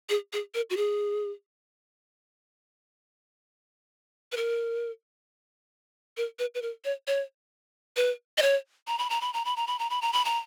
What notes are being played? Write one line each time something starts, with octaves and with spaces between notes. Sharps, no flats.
G#4
G#4
A#4
F#4
G#4
B4
A#4
A#4
B4
B4
A#4
C#5
C#5
B4
D#5
C#5
A#5
B5
A#5
B5
A#5
B5
A#5
B5
A#5
B5
A#5
B5
A#5